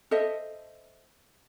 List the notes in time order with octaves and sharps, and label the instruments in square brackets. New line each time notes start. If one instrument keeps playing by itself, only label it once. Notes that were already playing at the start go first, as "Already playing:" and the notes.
[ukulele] A4 C5 D#5 E5